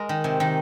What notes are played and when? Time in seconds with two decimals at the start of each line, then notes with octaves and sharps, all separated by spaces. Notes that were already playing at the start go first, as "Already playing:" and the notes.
Already playing: G#3 A#4
0.09 D#3
0.24 C3
0.40 D#3